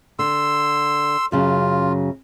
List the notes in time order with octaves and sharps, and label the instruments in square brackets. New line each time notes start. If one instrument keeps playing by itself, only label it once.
[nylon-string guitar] D3 [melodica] C6 E6
[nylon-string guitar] F#2 C#3 F#3 [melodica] F4